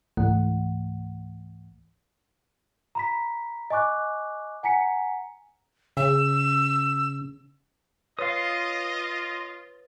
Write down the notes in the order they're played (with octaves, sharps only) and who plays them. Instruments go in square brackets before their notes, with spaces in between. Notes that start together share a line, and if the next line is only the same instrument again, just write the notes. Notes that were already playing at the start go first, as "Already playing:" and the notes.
[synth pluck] C#2 G#2 E3 A3 F#5
[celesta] A#5 B5 B6
D#5 G#5 C#6 D6 F#6
F#5 G#5 A#5 B6 C#7
[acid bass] C#3 [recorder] E6
[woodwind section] F4 [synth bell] B4 C#5 A6 [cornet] D#5 [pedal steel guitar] F5 D#6